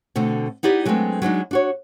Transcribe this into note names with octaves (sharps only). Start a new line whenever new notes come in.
B2 D3 A3 C4
B3 D#4 E4 G4 D5
F#3 G#3 A3 B3 C4 D4
F#3 G#3 D4 D#4
D4 F#4 C#5